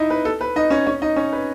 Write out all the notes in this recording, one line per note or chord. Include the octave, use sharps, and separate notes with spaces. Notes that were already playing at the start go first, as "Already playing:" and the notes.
Already playing: D#4 E4 D#5 E5
B4
A4
B4
D#4 D#5
C#4 C#5
C#4 C#5
D#4 D#5
C#4 C#5
B4